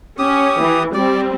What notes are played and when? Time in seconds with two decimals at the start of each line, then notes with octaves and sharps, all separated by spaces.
0.19 C#4 G4 D#6
0.61 E3
0.94 G3 C4 D5